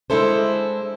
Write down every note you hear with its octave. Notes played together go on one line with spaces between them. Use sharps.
G#3 D4 E4 A4 C5